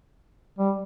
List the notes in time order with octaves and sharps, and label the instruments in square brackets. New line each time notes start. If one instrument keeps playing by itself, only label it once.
[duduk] G3